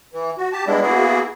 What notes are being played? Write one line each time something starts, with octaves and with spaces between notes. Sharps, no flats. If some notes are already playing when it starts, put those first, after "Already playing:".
E3
F#4
G4 A5
G3 G#3 B3 D4 E4
A#3 B3 E4 F#4 G#4